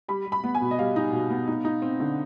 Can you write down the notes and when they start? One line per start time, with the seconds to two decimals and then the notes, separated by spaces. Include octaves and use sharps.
0.08 G3 B5
0.26 G3
0.32 B5
0.44 B3
0.55 G#5
0.61 B2
0.71 D#5
0.79 G3 F5
0.96 D#4
1.12 B2
1.31 B3
1.48 D#4
1.65 D#4
1.82 C4
2.00 D3